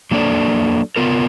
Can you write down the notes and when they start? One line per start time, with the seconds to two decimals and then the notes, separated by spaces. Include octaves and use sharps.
0.11 F#3 A#3 D4 A4 D5
0.96 B3 F4 A#4